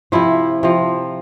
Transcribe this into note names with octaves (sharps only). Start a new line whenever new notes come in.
C3 F3 E4
C3 F3